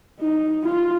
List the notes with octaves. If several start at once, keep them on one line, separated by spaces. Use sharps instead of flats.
D#4
F4